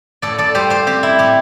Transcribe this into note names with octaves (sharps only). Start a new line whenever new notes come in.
A2 A4 D5
A4 D5
G3 G4 C5
G4 C5
C4 G4
E4
A2 G4